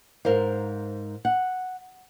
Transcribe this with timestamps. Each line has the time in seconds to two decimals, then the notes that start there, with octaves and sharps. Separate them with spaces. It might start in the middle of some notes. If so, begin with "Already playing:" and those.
0.25 G#2 A#4 C5 F5
1.25 F#5